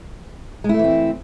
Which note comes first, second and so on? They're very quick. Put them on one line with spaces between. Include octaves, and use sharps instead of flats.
G#3 E4 A3 E3 C4